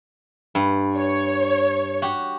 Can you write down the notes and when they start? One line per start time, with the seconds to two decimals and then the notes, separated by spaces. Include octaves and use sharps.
0.55 G2
0.98 C#5
2.02 F#4 G4